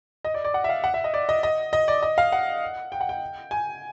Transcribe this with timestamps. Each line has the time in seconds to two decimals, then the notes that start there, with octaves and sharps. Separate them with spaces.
0.25 D#5
0.34 D5
0.44 D5
0.54 F#5
0.64 E5
0.69 F5
0.84 F#5
0.94 E5
1.04 D#5
1.14 D5
1.29 D#5
1.43 D#5
1.73 D#5
1.88 D5
2.02 D#5
2.18 F5
2.32 F#5
2.92 G5
3.01 F#5
3.09 G5
3.51 G#5